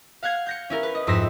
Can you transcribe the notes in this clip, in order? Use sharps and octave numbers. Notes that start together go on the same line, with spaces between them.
F5 F#5 F#6 G#6 C7
G6 A#6 C#7
C#4 E4 A#4
B4
D#5
F2 G#2 C6 E6 A#6 B6